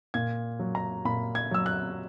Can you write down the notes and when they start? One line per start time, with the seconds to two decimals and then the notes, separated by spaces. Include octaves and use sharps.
0.14 A#2 G#6
0.60 F#3
0.75 A#5
1.05 A#2 B5
1.35 G#6
1.51 F#3 E6
1.66 F#6